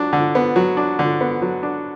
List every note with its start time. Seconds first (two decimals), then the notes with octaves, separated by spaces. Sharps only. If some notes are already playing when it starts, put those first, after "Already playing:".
Already playing: F#3 D4
0.13 D3
0.35 B3
0.56 F#3
0.77 D4
0.99 D3
1.21 B3
1.42 F#3
1.63 D4